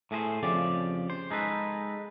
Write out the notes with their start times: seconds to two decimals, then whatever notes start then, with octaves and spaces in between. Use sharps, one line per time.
0.11 A2 A3 G#4 A#4 C5
0.43 F2 C#3 F3 G4 D5
1.10 C5
1.31 G#3 D#4 A4 B4